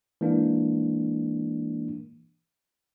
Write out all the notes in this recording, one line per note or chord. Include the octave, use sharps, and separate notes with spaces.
E3 G#3 A#3 D4